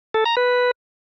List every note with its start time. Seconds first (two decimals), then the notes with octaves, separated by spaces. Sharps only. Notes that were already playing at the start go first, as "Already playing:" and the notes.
0.14 A4
0.25 A#5
0.37 B4